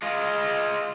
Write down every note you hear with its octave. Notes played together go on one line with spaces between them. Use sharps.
G#3 F4